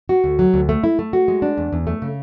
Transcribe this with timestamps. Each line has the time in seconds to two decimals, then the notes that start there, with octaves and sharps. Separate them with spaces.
0.09 F#4
0.24 D2
0.39 F#3
0.54 D2
0.69 A3
0.84 E4
0.99 A3
1.13 F#4
1.28 G#3
1.42 D4
1.57 E2
1.73 E2
1.87 A3
2.02 C#3